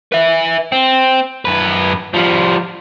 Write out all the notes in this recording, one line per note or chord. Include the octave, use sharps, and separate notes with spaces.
B4 E5
C4
F#2 B4
F3 G3